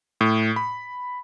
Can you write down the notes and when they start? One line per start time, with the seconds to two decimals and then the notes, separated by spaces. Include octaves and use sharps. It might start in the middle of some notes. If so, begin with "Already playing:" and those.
0.21 A2
0.56 B5